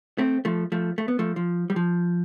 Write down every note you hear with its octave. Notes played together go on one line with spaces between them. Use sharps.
A3 C4
F3 A3
F3 A3
A3
B3
F3 A3
F3
G3
F3